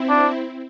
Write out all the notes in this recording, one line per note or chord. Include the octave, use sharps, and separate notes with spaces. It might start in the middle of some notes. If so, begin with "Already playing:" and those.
Already playing: C4 E4
D4